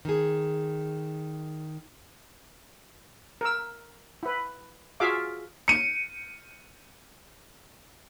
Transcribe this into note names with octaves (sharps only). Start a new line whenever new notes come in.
D#3 G#4
A#4 E6
E4 B4
F4 F#4 G#4 E5 F5 D6
C#7 D#7